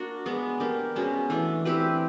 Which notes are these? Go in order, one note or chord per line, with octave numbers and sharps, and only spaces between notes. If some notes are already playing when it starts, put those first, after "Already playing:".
Already playing: A#3 D4 F#4
G#3 B3 D4
A#3 D4 G4 A#4
B2 G#3 C#4
E3 A3 D4
C4 E4 G4 B4